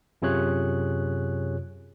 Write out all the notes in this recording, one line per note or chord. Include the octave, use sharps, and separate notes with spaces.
F#2 C3 F4 G#4 C#5 F#6